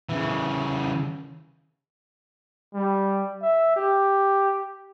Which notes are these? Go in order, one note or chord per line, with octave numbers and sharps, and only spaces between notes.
C#3 E3
G3
E5
G4